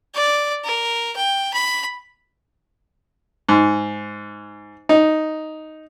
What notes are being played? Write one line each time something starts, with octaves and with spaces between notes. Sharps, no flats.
D5
A#4
G5
B5
G#2
D#4